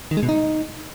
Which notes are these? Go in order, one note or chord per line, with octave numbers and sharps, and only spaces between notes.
D#3
G#3
B2
D#4